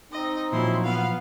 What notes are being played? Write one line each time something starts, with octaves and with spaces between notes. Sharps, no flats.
C4 D#4 D#5
A#2 F3 F#3 E4 C6
B3 F5